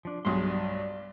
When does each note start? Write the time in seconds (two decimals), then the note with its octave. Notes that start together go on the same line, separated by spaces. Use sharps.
0.05 F3 D4
0.25 B1 G2 G#3 G#4 C6
0.48 D5